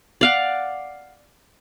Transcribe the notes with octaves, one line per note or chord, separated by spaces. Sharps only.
D5 F5 F#5